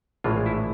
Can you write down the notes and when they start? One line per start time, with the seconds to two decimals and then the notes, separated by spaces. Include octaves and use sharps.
0.24 A#1 A2 E3 G#3 F4
0.46 E4